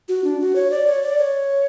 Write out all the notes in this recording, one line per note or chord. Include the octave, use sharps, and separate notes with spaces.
F#4
D4
F#4
C#5
D5
C#5
D5
C#5